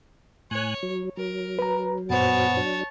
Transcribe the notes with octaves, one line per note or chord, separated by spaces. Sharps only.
A2 C#5 G#5 F#6
F#3
F#3 A#4
B4 A#5
F#2 A#2 B3 C5 C#5 A5
F#3 D4